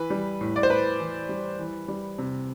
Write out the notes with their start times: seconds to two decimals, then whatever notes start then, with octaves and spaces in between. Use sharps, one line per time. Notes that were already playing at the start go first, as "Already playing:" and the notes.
Already playing: E3 B4
0.10 G3
0.41 A2
0.56 D5
0.63 C5
0.69 A2 B4
1.00 E3
1.29 G3
1.59 E3
1.88 G3
2.18 C3